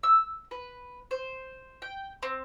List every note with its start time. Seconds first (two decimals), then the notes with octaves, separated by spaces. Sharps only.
0.03 E6
0.51 B4
1.11 C5
1.82 G5
2.23 C4